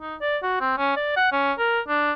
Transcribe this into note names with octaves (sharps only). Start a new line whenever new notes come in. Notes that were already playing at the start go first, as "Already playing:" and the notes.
D#4
D5
F#4
C4
C#4
D5
F#5
C#4
A#4
D4